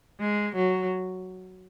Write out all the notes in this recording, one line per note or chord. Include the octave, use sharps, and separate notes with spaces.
G#3
F#3